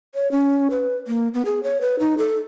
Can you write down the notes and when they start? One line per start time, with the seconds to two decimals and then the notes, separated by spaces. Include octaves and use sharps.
0.15 C#5
0.32 C#4
0.71 B4
1.07 A#3
1.34 B3
1.45 G#4
1.63 C#5
1.81 B4
1.99 D#4
2.18 A4